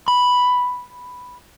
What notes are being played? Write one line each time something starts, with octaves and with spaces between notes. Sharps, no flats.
B5